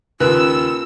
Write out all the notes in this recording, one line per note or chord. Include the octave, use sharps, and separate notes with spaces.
D#2 C#3 A#3 F4 A#4 B4 E6